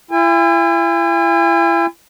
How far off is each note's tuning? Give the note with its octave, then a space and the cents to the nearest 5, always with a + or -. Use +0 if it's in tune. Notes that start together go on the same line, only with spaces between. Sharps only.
E4 +40 G#5 -40